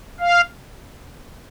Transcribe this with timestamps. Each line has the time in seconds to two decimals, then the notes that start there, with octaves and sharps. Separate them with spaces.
0.20 F5